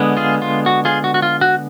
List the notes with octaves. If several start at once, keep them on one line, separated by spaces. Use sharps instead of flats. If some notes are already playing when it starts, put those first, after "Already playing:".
Already playing: D3 G#3 B3
F4 G#4
F4
F#4
F4 G#4
F#4
F#4
F4
F#4